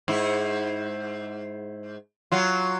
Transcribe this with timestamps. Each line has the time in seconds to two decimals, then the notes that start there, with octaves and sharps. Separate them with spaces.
0.08 G#2 E4
2.32 F#3 F4